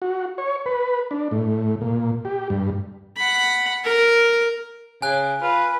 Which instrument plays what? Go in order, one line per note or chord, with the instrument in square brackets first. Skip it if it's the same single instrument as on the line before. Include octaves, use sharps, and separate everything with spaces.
[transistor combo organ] F#4
C#5
B4
D4
A2
A#2
G4
G2
[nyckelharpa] F#5 B5
A#4
[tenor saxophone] C#3 [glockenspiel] G#5 F#6
[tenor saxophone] F4 [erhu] B4